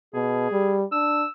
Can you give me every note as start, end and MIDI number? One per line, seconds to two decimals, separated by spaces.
0.14 0.51 47
0.14 0.80 68
0.52 0.84 55
0.92 1.24 62
0.92 1.29 88